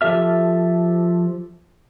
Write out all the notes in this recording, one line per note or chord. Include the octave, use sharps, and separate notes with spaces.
F3 G4 A4 E5 F6